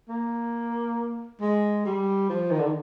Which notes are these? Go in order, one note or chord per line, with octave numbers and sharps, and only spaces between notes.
A#3
G#3
G3
F3
D#3
D3
D#3